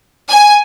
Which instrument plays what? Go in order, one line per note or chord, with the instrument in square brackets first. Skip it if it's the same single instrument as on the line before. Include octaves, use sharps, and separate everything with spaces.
[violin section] G#5